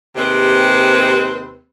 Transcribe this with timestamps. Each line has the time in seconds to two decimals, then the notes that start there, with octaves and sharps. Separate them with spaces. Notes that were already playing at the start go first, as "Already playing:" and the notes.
0.16 D#2 C3 G#3 C4 G4 B4